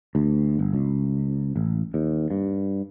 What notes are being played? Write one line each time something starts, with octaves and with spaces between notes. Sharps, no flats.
D2
G1
C#2
A1
D#2
G2